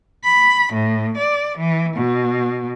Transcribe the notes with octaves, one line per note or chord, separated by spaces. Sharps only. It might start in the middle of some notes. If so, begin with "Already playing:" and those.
B5
A2
D5
E3
B2